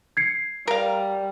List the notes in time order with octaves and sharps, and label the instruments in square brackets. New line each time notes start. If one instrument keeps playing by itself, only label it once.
[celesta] G#6 C7 C#7
[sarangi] G3 [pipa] A#4 F5